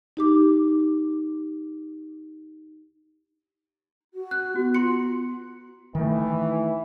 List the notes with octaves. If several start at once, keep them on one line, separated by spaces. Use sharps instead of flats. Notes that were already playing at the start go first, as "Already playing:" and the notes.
D#4 G4 D6
F#4
F#6
B3 F#4
F4 C6 C#7
D#3 E3 A3